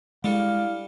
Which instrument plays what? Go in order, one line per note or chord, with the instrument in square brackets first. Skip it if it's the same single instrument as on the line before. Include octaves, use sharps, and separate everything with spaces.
[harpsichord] G3 D4 A4 [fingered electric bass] G#3 [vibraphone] E4 [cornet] F5